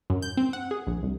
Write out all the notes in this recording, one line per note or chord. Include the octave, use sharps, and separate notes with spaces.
F#2
G6
C4
F#5
G#4
A#1
C2